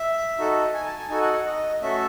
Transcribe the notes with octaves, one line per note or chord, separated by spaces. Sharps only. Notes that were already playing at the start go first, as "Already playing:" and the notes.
Already playing: E5
D#4 F#4 A4
G#5
A5
G#5
D#4 F#4 A4 G#5
F#5
F#5
D#5
A3 C#4 F#4 A4 E5